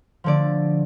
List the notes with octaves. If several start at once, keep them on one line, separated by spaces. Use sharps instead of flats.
D3 F3 A3 D5